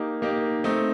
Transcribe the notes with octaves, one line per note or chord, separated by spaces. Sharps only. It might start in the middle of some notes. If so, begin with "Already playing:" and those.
Already playing: A#3 D#4 G4
A#3 D#4 G4
A3 C4 D#4